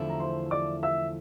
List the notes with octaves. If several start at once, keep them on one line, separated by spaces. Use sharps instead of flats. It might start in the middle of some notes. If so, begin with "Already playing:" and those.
Already playing: E2 D3 F3 A3 E4
A#5
C5 C6
D5 D6
E5 E6